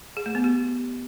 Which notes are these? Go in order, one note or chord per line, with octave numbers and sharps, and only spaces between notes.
G#4
A3
B3
G4